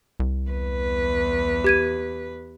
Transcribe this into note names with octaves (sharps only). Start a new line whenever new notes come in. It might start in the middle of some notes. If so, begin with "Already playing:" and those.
C2
E2 B4
G4 G#6 D#7